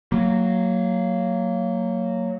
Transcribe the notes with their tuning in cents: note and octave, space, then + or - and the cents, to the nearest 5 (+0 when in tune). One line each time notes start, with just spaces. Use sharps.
F#3 +0 A#3 -20